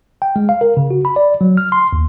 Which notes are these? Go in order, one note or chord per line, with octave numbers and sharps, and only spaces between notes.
G5
G#3
F5
A#4
C#3
F#4
B5
D5
F#3
F6
C6
D#2